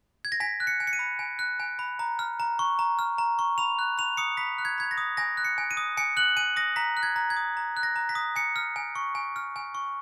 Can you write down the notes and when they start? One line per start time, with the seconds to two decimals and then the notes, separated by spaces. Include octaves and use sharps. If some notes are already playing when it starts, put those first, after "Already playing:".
0.25 G#6
0.32 A#6
0.40 G#5 B6
0.60 F#6
0.67 C#7
0.80 G#5
0.87 C#7
0.93 D#7
0.99 B5
1.19 G#5
1.39 F#6
1.60 G#5
1.79 B5
1.99 A#5
2.19 F6
2.40 A#5
2.59 C#6
2.79 A#5
2.99 F6
3.18 A#5
3.39 C#6
3.58 B5 F7
3.79 F#6
3.98 B5 F7
4.17 D#6 C#7
4.37 B5 B6
4.58 F#6
4.65 G#6
4.78 B5 G#6
4.91 A#6
4.98 D#6
5.17 G#5 A#6
5.37 F#6
5.45 C#7
5.58 G#5
5.71 D#7
5.77 D#6
5.97 G#5 C#7
6.17 F#6 F#7
6.36 G#5 D#7
6.56 D#6 A#6
6.76 A#5 B6
6.97 F#6
7.03 G#6
7.16 A#5
7.30 G#6
7.37 D#6
7.57 A#5
7.77 F#6
7.83 A#6
7.96 A#5
8.09 B6
8.15 D#6
8.36 G#5 C#7
8.56 F6
8.76 G#5
8.95 C#6
9.15 G#5
9.36 F6
9.56 G#5
9.75 C#6